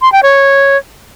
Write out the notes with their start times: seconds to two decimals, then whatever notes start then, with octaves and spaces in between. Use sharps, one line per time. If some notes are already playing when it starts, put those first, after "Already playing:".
0.02 C6
0.12 G5
0.23 C#5